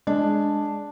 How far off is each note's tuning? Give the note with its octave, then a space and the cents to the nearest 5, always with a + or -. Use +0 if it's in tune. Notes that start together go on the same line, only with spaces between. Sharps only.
G#3 +0 D4 +0